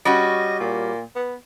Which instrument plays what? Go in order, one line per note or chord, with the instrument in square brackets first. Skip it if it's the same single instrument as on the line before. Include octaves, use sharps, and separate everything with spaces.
[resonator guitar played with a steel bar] G3 C#4 F#4 [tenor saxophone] D#5
[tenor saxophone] A#2
B3